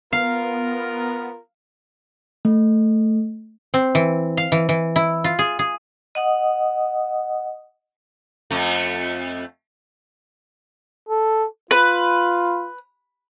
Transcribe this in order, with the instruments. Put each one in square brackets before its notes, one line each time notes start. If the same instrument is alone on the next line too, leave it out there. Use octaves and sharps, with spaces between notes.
[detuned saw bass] B3 [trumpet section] F4 A#4 [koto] F5
[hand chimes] A3
[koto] C4
E3
F5
E3
E3
E4
F4
G#4
G#4
[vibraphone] D#5 F#5 D#6
[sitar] F2 A3
[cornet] A4
[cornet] F4 [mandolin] B4